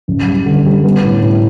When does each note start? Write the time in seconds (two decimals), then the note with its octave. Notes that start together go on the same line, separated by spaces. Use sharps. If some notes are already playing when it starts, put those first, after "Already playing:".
0.08 F#1
0.27 G3
0.46 D3
0.66 G3
0.84 B3
1.04 A2
1.23 A2